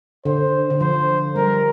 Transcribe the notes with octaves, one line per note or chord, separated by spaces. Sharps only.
D3 C5
D3
F3 C5
G3 A#4